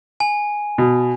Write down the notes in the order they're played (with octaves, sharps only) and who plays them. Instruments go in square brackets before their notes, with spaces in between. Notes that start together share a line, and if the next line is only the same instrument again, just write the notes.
[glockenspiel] G#5
[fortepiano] B2